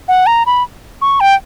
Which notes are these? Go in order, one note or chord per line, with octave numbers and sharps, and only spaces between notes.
F#5
A#5
B5
C#6
G5